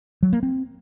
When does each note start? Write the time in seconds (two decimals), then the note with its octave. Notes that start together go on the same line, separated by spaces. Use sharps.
0.23 F#3
0.33 A#3
0.43 C4